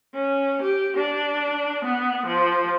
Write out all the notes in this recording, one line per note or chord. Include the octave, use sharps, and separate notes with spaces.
C#4
G4
D4
B3
F3